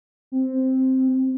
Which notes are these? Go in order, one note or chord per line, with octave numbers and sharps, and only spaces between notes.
C4